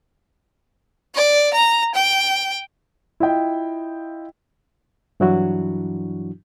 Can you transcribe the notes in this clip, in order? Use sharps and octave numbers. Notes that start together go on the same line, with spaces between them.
D5
A#5
G5
E4 F4 D#5 G5
G2 E3 F#3 D4 E4 F#4